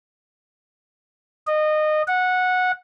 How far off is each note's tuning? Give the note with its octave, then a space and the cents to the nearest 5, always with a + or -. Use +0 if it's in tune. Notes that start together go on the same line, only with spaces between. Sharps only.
D#5 -25
F#5 -15